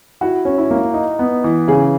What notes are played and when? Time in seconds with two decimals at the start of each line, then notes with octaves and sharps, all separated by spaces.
0.21 E4 F#4
0.45 C#4
0.58 E4
0.71 A#3
0.94 D#4
1.19 B3
1.44 E3
1.68 C#3 G#4